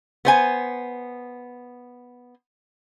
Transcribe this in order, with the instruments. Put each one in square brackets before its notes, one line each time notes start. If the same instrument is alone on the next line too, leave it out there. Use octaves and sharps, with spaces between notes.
[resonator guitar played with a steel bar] B3 C5 G#5